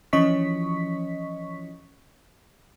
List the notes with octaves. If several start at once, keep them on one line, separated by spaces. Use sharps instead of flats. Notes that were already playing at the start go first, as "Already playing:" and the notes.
E3 F3 C#4 D#5 C#6 B6